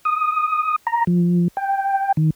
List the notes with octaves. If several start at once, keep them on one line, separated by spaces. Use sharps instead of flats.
D#6
A#5
F3
G5
D#3